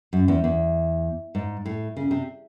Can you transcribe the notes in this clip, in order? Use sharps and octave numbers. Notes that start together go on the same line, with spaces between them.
F#2
E2
E2
G#2
A2
C#3
C3